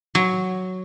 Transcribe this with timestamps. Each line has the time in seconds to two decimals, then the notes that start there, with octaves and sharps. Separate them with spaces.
0.15 F#3